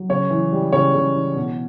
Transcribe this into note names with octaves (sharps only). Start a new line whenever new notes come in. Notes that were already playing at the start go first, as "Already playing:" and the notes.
Already playing: F#3
C#3 C#5
E3
G3
C#3 C#5
C#3
E3
B2